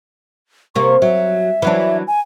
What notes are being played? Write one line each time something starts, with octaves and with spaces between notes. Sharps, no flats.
C3 A#3 C#6
F#3 E5
E3 F#3 D4
G#5